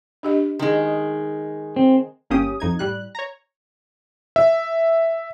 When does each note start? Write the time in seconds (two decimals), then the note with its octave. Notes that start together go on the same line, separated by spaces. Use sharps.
0.23 D4 G4 D#5
0.59 D#3 G#3
1.76 C4
2.30 G1 A#3 C#4 G4 D#6
2.60 F2 D#4 G#6
2.79 A2 G3 F#6
3.15 C#5 A#5
4.36 E5